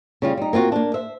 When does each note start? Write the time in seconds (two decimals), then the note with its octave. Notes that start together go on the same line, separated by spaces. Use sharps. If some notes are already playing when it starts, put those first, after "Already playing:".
0.22 C#3 G3 F4
0.37 G3 D#4
0.53 A#3 C4 F4 F#4
0.72 A#3 D4
0.94 C5 E5